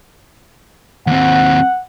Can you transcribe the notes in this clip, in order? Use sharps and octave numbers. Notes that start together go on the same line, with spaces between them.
D#2 C4 F#5